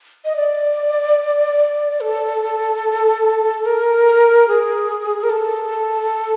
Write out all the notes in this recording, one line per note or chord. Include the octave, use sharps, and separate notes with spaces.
D#5
D5
A4
A#4
G#4
A#4
A4